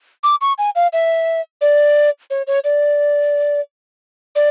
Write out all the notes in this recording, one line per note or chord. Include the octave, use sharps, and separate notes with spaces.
D6
C#6
G#5
F5
E5
D5
C#5
C#5
D5
D5